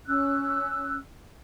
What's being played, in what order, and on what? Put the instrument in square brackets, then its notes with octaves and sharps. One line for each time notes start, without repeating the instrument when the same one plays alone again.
[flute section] C#4 E6 F#6